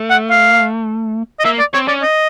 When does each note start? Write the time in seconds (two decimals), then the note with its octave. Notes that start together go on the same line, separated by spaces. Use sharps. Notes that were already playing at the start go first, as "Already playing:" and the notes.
Already playing: A3
0.11 F#5
0.30 F5
1.39 D#5
1.45 A#3 E5
1.59 D5
1.74 C4 C#5
1.88 C#4 D5
2.02 D#5